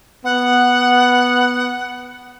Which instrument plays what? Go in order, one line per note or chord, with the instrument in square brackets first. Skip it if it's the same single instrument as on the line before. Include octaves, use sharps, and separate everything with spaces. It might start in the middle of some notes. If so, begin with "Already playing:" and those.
[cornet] B3 [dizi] F#5